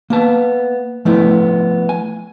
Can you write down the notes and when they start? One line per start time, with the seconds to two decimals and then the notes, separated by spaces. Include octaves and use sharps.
0.10 A#3 B3 A5
1.05 F3 A3 B3 E4
1.89 G#5